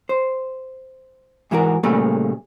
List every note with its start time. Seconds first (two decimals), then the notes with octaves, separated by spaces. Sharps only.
0.09 C5
1.51 G#2 E3 E4 F#4 A#4
1.83 A#2 C#3 G3 A3 A#3